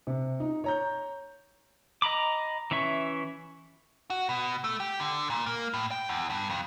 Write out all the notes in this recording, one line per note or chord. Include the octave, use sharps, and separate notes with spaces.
C3
D#4
C#5 A#5 G6
D#5 A#5 B5 D6
E3 C#4 E5 C#6
F#4
B2
A3
G4
D3
A#2
A#3
A2
G5
E2
G2
F2